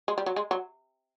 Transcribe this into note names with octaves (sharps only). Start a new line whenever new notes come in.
G#3
G3
F#3
G#3
F#3